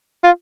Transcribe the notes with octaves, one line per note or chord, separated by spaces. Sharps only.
F4